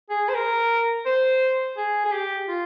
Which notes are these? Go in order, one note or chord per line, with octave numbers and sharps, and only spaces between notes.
G#4
C5
A#4
C5
G#4
G#4
G4
F4